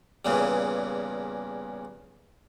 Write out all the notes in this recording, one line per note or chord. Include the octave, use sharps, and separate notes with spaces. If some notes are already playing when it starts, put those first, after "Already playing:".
E2 G2 A#2 C#3 E3